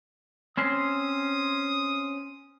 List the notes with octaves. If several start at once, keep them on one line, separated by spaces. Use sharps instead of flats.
C4 C#4 C5 D#6